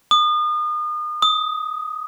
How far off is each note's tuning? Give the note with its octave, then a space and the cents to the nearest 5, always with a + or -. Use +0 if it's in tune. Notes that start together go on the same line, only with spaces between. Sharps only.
D#6 -35
D#6 +15